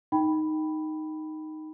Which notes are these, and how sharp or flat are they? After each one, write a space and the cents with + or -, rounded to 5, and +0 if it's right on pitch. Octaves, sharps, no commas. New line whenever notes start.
D#4 +0 G5 +0 B5 +0